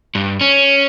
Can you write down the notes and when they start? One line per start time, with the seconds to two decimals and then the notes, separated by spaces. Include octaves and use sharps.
0.15 G2
0.41 C#4